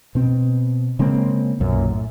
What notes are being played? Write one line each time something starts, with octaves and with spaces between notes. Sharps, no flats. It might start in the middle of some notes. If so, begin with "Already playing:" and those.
B2 C4
C#3 G#3 A#3 C4
B1 F#2 A#2
A2